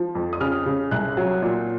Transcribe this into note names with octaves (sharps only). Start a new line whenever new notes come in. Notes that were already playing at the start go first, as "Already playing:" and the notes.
Already playing: F3
F2
D#6
C#3 F6
C#3
C2 F#6
F#3
A#2